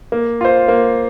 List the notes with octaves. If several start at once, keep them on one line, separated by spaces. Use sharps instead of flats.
A#3
F4 C5
A#3